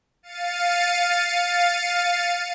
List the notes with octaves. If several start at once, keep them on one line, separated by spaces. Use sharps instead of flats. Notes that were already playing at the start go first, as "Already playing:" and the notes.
F5 A6 C#7 D#7